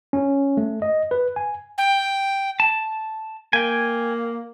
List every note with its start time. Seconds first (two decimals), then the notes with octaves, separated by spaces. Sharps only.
0.13 C#4
0.57 A3
0.82 D#5
1.11 B4
1.36 G#5
1.78 G5
2.60 A5
3.53 A#3 G5 G#5